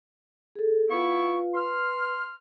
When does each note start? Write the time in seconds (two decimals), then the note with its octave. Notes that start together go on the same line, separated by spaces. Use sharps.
0.55 G#4 A4
0.90 B3 E4 F4 B4 F5 C#6
1.55 B4 C6 F6